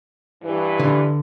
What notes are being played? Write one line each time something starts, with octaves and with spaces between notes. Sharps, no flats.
G2 E3
D3